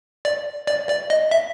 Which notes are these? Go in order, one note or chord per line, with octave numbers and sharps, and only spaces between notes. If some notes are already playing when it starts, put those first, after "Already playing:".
D5
D5
D5
D#5
E5